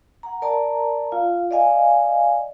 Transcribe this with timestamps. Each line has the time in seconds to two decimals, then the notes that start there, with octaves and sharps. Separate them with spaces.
0.23 F#5 A#5
0.42 A#4 D5 A5 A#5
1.12 F4 F5
1.51 D5 D#5 F5 G#5